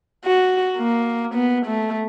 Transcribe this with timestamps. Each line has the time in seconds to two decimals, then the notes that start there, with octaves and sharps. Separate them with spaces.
0.25 F#4
0.77 A#3
1.35 B3
1.66 A3